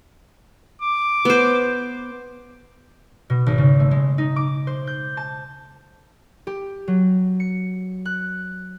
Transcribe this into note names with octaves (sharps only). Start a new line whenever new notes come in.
D6
B3 C5
B2
G#1
C#3
A3
G#3
D#4
D6
C5
G6
A5
G4
F#3
C#7
F#6